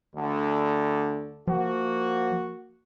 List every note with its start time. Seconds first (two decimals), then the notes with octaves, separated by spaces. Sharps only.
0.15 D2 D3
1.47 F3 A#3 F#4